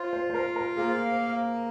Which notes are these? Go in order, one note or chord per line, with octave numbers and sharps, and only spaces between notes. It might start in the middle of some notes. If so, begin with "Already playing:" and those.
Already playing: F4 C5
C5
C5
A#4 F5
A#4
A#3 G#4